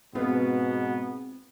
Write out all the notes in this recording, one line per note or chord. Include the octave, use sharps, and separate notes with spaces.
G#2 B2 B3 C4 F4 B4